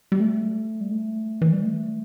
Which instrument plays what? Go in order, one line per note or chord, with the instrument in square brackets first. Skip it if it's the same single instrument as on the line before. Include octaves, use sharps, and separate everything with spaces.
[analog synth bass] G3
A3
G3
A3
E3
G3
A3